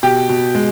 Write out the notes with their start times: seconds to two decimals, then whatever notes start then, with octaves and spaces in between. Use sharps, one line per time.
0.03 B2 G4
0.29 B2
0.55 G#3